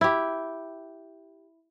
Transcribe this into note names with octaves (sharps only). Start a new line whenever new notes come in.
E4 G4